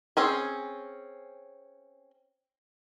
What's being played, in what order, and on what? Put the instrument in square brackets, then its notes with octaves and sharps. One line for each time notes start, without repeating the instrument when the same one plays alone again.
[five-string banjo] C4 C#4 G#4